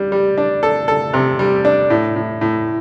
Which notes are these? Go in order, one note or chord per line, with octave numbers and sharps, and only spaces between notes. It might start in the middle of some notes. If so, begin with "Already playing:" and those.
Already playing: G3 D4
G3
D4
A4
A4
C3
G3
D4
A2
A2
A2